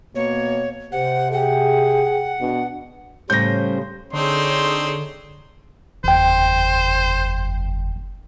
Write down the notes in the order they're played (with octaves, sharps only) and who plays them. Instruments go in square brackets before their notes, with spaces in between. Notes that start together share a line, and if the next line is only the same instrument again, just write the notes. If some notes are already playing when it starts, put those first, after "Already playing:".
[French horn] B2 [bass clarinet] A#3 [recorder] C#5
[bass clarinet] C3 [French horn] G4 [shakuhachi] C5 [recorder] F#5
[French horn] G#4 [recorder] F#5 [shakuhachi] G5
[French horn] B2 [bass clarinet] D4
[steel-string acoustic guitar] A2 C#3 [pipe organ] G3 C#4 C5 [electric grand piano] G6 A#6
[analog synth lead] D3 [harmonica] C4 D4 D#4 [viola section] G#4 C#5 [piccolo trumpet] C6
[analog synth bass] F#1 [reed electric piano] E2 G5 [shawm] C5